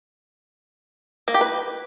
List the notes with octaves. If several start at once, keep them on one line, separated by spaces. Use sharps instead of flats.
A#3
G4
B4